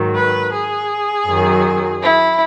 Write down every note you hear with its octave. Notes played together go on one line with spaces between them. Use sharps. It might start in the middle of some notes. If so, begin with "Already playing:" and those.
Already playing: G#2 D#3 F#3
B4
G#4
F#2 D#3 F#3
E4